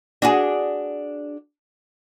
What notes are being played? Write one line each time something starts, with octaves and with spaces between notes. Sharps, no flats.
D4 F#4 G#4